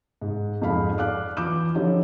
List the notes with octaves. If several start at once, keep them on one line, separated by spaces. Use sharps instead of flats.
G#2
F2 G#2 F5 B5
D5 F5 D6 F#6
E3 F4 D6 G6 E7
D3 F3 D#4 E4 G4 C#5